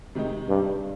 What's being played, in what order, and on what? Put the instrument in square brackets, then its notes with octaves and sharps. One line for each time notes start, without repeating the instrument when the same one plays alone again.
[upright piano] C3 D#3 G#3 D#4
[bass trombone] G2